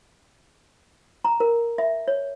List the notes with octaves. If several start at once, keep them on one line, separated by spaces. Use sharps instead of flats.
A#5
A#4
E5
C#5